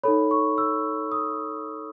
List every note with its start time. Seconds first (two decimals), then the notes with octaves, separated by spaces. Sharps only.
0.04 D#4 A4 C#5 B5
0.31 C#6
0.58 E6
1.12 D#6